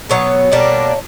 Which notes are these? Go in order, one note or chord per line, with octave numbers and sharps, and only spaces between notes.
B2 F#3 B3 C#5
B2 G3 A#3 D4